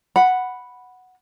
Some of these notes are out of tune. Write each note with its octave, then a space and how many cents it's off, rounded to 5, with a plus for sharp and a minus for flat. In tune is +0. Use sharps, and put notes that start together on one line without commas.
F#5 +0 B5 +0